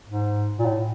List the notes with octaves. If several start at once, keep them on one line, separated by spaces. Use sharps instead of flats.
G#2
A#2
A2